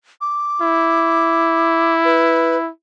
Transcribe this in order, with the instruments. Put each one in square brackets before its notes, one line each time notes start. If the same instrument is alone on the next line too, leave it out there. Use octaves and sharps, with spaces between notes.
[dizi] D6
[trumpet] E4
[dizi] B4